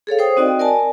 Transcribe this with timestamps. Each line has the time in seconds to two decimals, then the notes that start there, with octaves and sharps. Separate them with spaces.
0.07 G#4 A4 C#5 F5
0.19 C5 F5 G5 D#6
0.37 C4 D#4 F#4 D5 D#5 G5
0.59 A#4 D5 G#5 A5